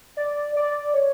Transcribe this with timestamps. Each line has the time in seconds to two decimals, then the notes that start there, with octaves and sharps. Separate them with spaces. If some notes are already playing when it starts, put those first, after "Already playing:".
0.17 D5
0.56 D5
0.94 C#5